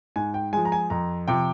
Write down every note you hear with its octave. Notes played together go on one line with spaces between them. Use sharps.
G#2 G#5
G5
F3 G#3 G#5
A#5
G#5
F2 A#5
C3 F3 G5